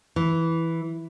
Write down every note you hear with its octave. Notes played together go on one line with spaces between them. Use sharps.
E3